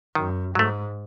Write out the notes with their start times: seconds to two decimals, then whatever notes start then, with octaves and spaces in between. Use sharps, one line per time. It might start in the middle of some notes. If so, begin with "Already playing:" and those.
0.15 F#2 D#3
0.55 G#2 F#3 A3